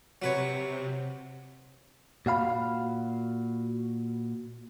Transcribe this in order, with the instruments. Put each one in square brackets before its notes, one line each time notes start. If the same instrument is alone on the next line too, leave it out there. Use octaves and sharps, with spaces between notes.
[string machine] C3 [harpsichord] F#3 B4 C#5
[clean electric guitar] A#2 F#4 F5 B5